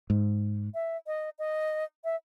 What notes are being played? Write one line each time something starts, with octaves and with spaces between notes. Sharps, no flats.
G#2
E5
D#5
D#5
E5